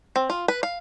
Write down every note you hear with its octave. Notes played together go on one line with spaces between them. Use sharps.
C4
F4
B4
F5